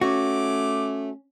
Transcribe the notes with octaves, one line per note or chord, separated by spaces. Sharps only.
A3 C#4 F#4 D6